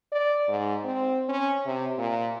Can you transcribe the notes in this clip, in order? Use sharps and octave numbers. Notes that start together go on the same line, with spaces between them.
D5
G#2
C4
C#4
C3
A#2